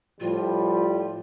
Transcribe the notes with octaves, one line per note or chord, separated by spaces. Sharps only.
A2 F3 G3 F4